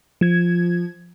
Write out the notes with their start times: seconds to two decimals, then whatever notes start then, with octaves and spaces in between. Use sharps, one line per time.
0.21 F3 G#6